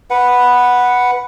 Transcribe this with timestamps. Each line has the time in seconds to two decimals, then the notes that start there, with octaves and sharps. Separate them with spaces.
0.10 B4 F#5